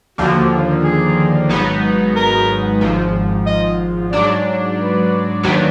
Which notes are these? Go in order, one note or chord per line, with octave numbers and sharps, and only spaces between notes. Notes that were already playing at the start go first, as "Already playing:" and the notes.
D#2 D3 F3 A#3 F#4
G#4
G#1 G#2 F#3 B3 D#4
A#4
G#1 G#2 F3
D#5
G#2 F#3 D4 D5
B4
D#2 D#3 F#3 B3 D4